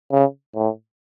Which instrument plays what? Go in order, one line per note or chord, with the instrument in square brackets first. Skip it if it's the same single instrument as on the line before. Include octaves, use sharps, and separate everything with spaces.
[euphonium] C#3
A2